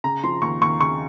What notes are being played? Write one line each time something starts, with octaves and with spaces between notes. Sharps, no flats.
C#3 A#5
F3 C6
D#2 C#6
D#2 C#6
C#3 C#6